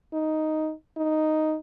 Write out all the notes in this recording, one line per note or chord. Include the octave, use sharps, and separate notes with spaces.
D#4
D#4